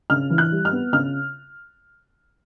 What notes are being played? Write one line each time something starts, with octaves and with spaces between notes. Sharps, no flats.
C#3 F6
E3
F#6
G3
F6
B3
C#3 F6